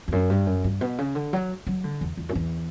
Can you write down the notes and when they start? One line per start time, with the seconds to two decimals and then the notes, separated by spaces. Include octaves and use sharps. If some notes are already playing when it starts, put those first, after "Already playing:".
0.08 E2
0.12 F#2
0.30 G2
0.46 F#2
0.64 G2
0.81 B2
0.98 C#3
1.15 D3
1.33 F#3
1.67 F#3
1.84 D3
2.01 E2
2.17 E2
2.29 F#2
2.35 E2